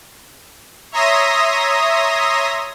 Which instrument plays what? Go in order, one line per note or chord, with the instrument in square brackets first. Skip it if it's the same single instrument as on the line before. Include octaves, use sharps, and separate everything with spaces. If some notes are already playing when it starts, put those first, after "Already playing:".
[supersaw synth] C#5 E5 A#5 C6 D#6 A#6